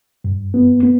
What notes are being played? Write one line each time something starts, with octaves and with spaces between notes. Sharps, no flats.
G2
B3
B3